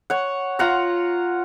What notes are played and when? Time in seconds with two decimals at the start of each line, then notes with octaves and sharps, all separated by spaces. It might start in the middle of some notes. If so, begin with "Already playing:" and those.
0.10 C#5 F#5
0.59 F4 F#5 A#5